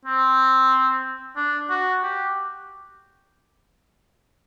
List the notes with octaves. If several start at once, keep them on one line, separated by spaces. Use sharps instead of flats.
C4
D4
F#4
G4